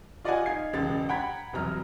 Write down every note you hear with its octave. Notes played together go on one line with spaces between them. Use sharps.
F4 D5 D#5 F5 F#5 G#5
D#4 F5 G#6 C7
E1 C#2 G#3 A6
F#5 G5 A#5 B5 G#6 B6
E1 C2 F#3 A#5 F6